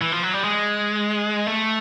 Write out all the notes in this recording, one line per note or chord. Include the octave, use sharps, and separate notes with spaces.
E3
F3
F#3
G3
G#3
A3